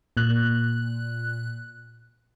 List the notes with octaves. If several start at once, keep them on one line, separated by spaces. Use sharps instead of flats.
A#2 F#6